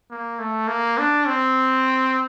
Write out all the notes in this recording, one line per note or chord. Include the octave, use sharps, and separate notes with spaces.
A#3
A3
A#3
D4
C4